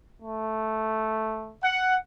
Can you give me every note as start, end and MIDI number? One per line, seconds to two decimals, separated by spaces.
0.22 1.55 57
1.63 1.96 78